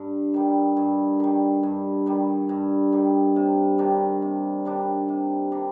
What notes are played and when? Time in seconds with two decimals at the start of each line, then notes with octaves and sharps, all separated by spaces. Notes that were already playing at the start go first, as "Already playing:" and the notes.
Already playing: G2
0.34 D#3 G3
0.77 G2
1.20 D#3 G3
1.63 G2
2.06 D#3 G3
2.49 G2
2.92 D#3 G3
3.36 C3
3.78 D#3 G3 D4
4.22 C3
4.65 D#3 G3 D4
5.09 C3
5.52 D#3 G3 D4